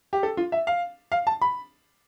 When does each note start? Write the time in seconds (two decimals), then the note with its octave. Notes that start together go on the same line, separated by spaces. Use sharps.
0.13 G4
0.23 A4
0.37 F4
0.52 E5
0.67 F5
1.12 F5
1.27 A5
1.42 B5